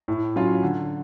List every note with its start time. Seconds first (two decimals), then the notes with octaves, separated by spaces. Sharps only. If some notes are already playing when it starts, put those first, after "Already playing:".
0.08 A2
0.36 F#3 C#4 F4
0.63 D3